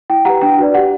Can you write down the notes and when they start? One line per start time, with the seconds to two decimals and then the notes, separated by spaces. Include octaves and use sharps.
0.10 E4 G5
0.25 G4 B4 F#5 A#5
0.41 D4 G5
0.58 F#4 B4 D5
0.74 G4 F#5